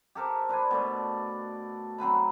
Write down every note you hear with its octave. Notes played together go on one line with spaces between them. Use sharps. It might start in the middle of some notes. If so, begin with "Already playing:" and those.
G4 A4 A#4 C5
D4 B4 C5 G#5
B2 A3 D5
F#3 C4 B4 B5